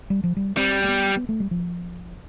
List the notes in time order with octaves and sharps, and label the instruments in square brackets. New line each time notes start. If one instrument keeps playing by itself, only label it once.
[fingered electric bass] G3
F3
G3
[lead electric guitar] G3 [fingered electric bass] C4
[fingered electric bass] A3
B3
B3
A3
G3
F3